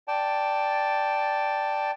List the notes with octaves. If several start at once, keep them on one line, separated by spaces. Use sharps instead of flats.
D5 G5 A5